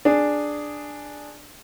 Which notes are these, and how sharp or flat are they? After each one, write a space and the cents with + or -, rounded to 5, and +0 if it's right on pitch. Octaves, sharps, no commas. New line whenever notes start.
D4 +5 G#4 +0